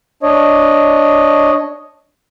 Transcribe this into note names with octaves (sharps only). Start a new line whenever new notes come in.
D4 C#5 D#5